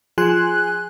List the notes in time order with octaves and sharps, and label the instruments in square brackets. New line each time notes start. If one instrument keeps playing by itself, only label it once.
[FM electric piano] F3 G#4 G#5 C6 F#6